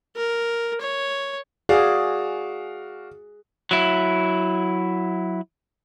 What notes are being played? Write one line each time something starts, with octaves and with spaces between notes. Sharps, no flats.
A#4
C#5
F#4 G#4 D5 F5
F#3 E4